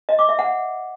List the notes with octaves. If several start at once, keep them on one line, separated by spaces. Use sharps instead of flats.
D#5
D6
E5
F#5